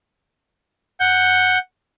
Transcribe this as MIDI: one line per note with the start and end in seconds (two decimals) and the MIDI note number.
1.00 1.58 78
1.00 1.58 91